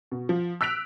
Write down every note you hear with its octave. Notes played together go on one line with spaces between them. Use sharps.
B2
F3
E6 F#6 B6 D7 F7